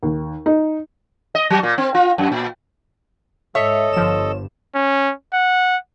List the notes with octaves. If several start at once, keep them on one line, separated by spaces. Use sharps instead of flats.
D#2
D#4
D#5
F#3
A#2
C4
F4
F#2
A#2
G#2 A4 C#5 D#5 E5
G1 G2 F3 E7
C#4
F#5